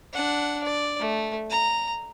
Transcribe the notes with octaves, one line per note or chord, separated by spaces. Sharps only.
D4 F#5
D5
A3
A#5